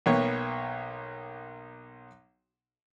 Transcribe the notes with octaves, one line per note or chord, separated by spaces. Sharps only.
B1 A#3 B3 C#5 G5